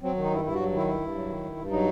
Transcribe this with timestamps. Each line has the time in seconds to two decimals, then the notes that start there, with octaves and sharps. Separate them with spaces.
0.03 F#3 C4
0.16 D#3
0.23 D#4
0.31 G2 E4
0.44 G2 E4
0.55 F#3 F#4
0.72 D#3 E4
0.87 G2 E4
1.01 G2
1.15 F#3
1.28 D#3
1.43 G2
1.57 G2
1.71 F#3 D#4